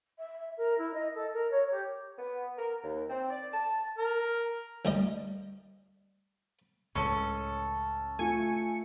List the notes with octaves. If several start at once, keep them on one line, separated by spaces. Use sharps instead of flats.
E5
A#4
E4
D#5
A4
A#4
C#5
G4
B3
A#4
D#2
C4
D5
A5
A#4
D2 G3 D#5
C#2 A2 C#4 A4
A3 F4 G#5 C#7